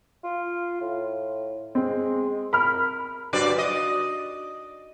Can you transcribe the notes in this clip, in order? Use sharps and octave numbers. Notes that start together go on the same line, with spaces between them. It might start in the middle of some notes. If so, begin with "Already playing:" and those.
F4
A2
G#3 C4
A#4 B5 F6
G2 F#3 D5
D#5